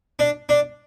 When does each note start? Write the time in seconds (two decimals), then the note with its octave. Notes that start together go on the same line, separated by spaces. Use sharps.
0.19 D4
0.49 D4